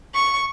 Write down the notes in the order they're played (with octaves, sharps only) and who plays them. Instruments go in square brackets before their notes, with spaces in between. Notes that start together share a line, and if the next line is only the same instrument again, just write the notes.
[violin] C#6